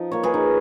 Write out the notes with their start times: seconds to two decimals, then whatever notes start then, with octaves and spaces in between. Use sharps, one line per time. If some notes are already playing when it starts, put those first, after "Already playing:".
Already playing: F3 D#4
0.12 A#3 C#5
0.24 G#4 B4
0.34 D#4